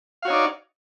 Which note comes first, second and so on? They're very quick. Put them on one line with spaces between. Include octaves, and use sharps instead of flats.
F5 F#4 C#5 D#4 D5